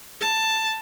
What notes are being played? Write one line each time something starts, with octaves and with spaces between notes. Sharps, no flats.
A5